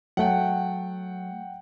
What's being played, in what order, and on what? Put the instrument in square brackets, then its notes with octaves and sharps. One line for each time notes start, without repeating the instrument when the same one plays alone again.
[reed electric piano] F#3 A3 [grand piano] F#5 G5